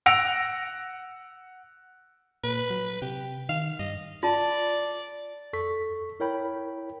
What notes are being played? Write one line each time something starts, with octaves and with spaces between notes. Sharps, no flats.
F#5 E6 A#6 D7 F7
A#2 B4
F#3
C3 G4
D#3 F5
G2 D#5
F4 D5 A5
F2 A4 C#6 B6
E4 A#4 C#5 G5 B5